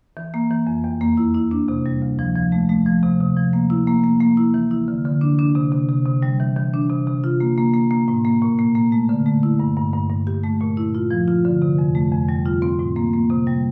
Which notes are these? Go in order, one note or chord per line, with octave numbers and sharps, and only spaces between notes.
E3
A#3
E3
F2
E2
A#3
E4
E4
D4
C3
G3
D2
F3
F3
A3
A3
F3
C3
C3
F3
A#3
E4
A#3
A#3
A#3
E4
E3
E4
D3
D3
D4
D4
C3
C3
C3
C3
G3
E3
E3
D4
C3
C3
F4
A#3
A#3
A#3
A#3
A2
A#3
A#2
A#3
A#3
A3
D3
A3
E4
G2
G2
G2
G2
G4
A3
A#2
E4
F4
F3
F4
D3
C3
F2
A3
F2
G3
F4
C4
A2
A#3
A#3
C3
G3